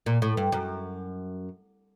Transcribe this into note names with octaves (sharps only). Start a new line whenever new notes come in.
A#2
A2
G2
F#2